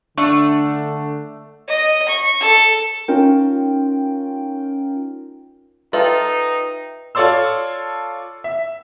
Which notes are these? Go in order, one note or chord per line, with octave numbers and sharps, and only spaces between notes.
D3 A3 D4 C#6
D#5
C#6
A4
C#4 D#4 F4 A#4 G5
D#4 F4 A4 B4 E5 G5
F4 A4 C#5 D5 C6 E6
E5